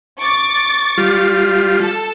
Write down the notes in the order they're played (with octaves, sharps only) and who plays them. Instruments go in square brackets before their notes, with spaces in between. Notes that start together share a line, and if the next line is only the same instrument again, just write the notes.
[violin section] C#6 D6 A6
[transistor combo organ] G3 F4
[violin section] A4 A5